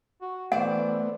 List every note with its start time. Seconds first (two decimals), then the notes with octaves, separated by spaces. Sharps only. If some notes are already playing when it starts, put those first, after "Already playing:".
0.21 F#4
0.52 E3 A3 B3 C5 D5 F#5